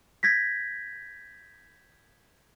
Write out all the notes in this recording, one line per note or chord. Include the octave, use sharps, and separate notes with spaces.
G6 G#6 A#6 B6